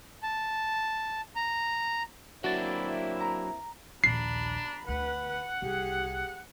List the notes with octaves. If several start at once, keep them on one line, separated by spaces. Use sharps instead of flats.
A5
A#5
F#3 A#3 C4 D4 E4 F#4 A6
A#5
A#1 D#2 D4 A#5 B5 C7
D2 B4 F#5
C2 G4 G#4